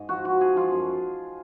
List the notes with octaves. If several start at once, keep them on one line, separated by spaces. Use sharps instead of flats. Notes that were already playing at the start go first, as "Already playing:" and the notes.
Already playing: G#2 D#5
F3 F#4
F3 F#4
F3 G#4
F3 F4
F#2